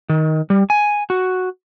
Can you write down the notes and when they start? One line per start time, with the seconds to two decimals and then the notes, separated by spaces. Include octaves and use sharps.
0.09 D#3
0.50 G3
0.70 G#5
1.10 F#4